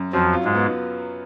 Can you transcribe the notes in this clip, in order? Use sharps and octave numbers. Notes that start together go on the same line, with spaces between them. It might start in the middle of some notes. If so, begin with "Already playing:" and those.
Already playing: F#2
F2 F3 F#3
F4
G#2 G#3
B3